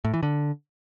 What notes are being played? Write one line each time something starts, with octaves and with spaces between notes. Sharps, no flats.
A2
E3
D3